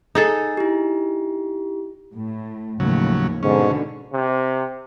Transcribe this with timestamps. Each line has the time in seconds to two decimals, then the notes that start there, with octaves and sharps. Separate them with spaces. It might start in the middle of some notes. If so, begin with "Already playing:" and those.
0.15 D#4 G#4 A4
0.57 E4 G4
2.14 A2
2.80 D#2 A2 C#3 F3 F#3
3.43 G#2 B2 D3 C#4
4.13 C3